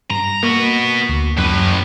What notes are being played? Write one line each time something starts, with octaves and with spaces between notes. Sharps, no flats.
G2 A#5
A#3 B3 F#4
D2
F#2 A2 B4